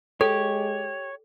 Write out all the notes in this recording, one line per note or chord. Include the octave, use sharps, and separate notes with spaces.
G#3 G4 A4 C#5